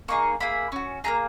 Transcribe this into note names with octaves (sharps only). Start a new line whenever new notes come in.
A#3 D#4 G#4 C#6
A#3 E4 G#4 B5
C#4 F#4
A#3 E4 G#4 A#5